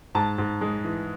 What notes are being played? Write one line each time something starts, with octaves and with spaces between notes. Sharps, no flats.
G#2 A5
G#2
G#3
E3